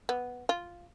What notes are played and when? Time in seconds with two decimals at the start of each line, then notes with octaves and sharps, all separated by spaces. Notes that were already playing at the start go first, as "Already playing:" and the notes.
0.09 B3
0.49 F4